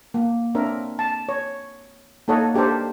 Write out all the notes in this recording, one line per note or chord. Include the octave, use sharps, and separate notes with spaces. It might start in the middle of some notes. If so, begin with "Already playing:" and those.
A#3
C4 D4 A#4 C#5 E5
A5
C#5
A#3 D#4 A4 C#5 D#5 F#5
D4 G4 A4 A#4 C5